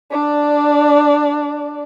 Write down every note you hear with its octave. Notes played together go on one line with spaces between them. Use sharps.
D4 D5